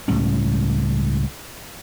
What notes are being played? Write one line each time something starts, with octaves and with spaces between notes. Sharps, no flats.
C#2 A2 G3 C#4